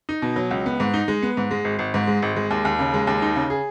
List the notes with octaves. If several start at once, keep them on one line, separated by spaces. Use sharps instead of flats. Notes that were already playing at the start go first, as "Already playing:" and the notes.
D#4
B2
F#3
C#2
B3
G#2
D#4
G#3
B3
G#2
G#3
G#1
G#1
G#2
G#3
G#1
G#3
D#2
D#2
C#3
G#3
D#2
D#4
C#3
G#4